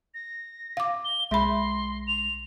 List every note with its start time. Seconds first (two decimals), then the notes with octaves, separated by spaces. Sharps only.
0.14 A#6
0.77 F5 D6
1.05 G7
1.31 B1 G#3 E5 B5 C6 A#6
2.08 F7